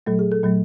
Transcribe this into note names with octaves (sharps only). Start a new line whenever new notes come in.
A#2 F#3 A3 A4
G#4
A4
A#2 F#3 A3